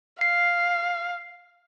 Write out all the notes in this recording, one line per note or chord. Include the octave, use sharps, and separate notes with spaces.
F5 C7